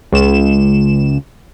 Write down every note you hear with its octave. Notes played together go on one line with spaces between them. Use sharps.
C#2 E7